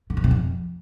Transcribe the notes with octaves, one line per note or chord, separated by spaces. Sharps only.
D3
F#2
C3
F2